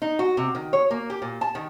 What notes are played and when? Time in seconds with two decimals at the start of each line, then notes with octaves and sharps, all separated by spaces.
0.02 D#4
0.19 F#4
0.37 C3
0.55 D#3
0.73 C#5
0.90 A#3
1.10 G4
1.22 A#2
1.41 A5
1.55 D#3